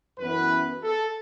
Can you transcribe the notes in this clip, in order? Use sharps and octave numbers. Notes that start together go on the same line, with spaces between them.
F#2 E3 B3 B4
A4